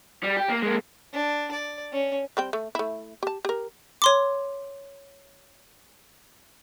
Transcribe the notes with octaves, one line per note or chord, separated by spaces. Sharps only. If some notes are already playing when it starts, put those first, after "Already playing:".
G3
G4
A#3
G#3 A#3
D4
D5
C#4
G3 C4 G5
A3
A3 E4
G4 A5
G4 A#4
C#5 C6 D6